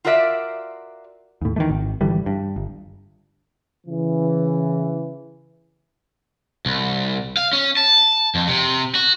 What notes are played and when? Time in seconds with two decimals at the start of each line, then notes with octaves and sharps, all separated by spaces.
0.05 F4 F#4 A#4 D5 E5 F5
1.41 D#2 A2
1.56 D#3 E3 A3
1.69 G#1
2.01 G#1 D3 E3 G3
2.26 G2
2.56 G1
3.87 C#3 E3
6.66 C2
7.37 F5
7.53 C#4
7.77 A5
8.35 F2
8.48 C3
8.95 F#4